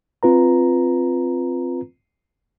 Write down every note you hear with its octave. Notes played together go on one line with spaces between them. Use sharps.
C4 F4 B4 A#5